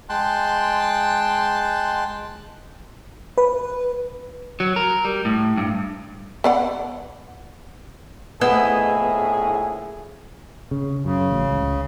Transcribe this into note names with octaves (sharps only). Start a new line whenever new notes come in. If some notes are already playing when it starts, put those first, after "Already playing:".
G#3 G5 A5 C6 F#6
B4
F#3
A#4
G3
A2
G2
B3 D5 F#5
A#1 A2 B3 E4 G#4 D#5
C#3
F#2 C#3
A1
C#2